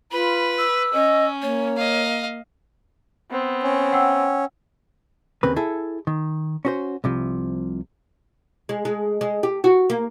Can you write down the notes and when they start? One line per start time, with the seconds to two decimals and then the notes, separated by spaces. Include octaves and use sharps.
0.12 F4 B4 B5
0.57 E6
0.94 C#4 D#5
1.42 A#3 C#5
1.77 D#5 F5
3.31 B3 C4
3.63 C#4
3.92 F#5 G5 E6
5.43 D#2 C#3 A#3 C4 B4
5.56 E4 G#4 A4 E5
6.07 D#3
6.65 C#4 F#4 C5
7.04 C2 C3 F3
8.69 G#3
8.85 G#3
9.21 G#3
9.43 G4
9.64 F#4
9.90 A#3